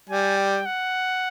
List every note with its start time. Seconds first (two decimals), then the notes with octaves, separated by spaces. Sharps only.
0.09 G3 G#5
0.37 G5
0.66 F#5